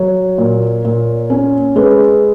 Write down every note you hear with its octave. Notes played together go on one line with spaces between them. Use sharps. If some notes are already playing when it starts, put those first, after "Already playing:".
Already playing: F#3 C#5
A#2
A#2
C#4
G#3 B4